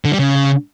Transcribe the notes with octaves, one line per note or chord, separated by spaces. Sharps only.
D3
G3
C#3